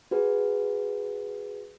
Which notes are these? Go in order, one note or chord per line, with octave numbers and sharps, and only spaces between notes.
F#4 G#4 B4